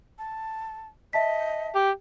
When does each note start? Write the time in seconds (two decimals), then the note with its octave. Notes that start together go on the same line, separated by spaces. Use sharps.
0.18 A5
1.13 D#5 E5 A5 B6
1.75 G4